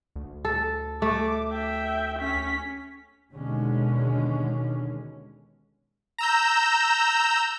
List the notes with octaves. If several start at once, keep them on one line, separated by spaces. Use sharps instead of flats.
D2
A4
A3 D6
E5 G5
C#4 B6
D#2 B2 D3 G#3 C#4
A#5 E6 G6